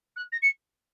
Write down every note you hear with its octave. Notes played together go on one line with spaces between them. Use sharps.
F#6
A#6
C#7